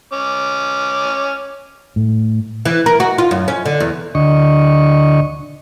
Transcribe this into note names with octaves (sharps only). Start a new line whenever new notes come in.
C#4 D6
A2
E3
A#4
F#4
F4
F#2
C#4
D3
E2
D2 D3 D#5 C#6